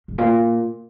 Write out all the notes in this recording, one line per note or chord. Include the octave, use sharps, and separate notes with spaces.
G#2
A#2